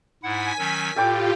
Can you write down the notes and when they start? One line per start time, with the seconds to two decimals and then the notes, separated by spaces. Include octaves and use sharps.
0.23 G#2 E4 F#5 G#5 B6
0.59 D#3 F#3 C#4
0.96 A2 F4 G4 A4 G5 D6